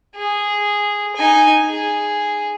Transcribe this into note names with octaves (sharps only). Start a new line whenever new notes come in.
G#4
D#4 G#5
G#4